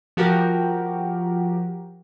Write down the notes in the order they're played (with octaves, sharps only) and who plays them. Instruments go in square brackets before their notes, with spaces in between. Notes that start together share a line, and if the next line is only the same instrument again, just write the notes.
[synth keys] F3 F#4 G4 A#4